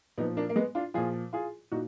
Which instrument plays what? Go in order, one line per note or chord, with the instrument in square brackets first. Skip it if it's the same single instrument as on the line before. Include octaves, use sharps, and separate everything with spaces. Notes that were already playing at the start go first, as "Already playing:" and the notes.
[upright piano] A#2 B3 D#4
F3
A#3 D4
A#3
G#3 B3
D4 F4
A#2 F3 F4 G#4
F4 G#4
A#2 D#4 F#4